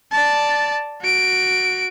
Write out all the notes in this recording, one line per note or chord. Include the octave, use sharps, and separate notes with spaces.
D5 A5
F#4 D7